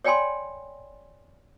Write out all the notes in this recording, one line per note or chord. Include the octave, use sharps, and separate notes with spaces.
C#5 D5 G5 G#5 B5 C6